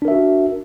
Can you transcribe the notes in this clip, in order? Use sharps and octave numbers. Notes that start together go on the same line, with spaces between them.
D4 F#4 A#4 E5